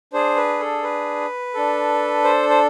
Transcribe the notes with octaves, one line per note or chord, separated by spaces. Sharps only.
D4 G#4 C5
B4
A4
B4
D4 A4
C5
C5